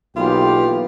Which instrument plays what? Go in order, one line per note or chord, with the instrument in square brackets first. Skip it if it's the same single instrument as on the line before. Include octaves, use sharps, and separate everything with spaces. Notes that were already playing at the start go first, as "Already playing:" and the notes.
[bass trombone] B1 [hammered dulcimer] E3 A#3 B3 [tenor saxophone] F4 [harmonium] G4